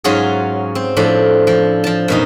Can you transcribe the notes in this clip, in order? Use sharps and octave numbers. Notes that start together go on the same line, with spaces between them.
G#2 F#3 C#4 F4 F#4 G#4
C4
A2 F3 D4
F3
F3 A5
F#2 B2 D#4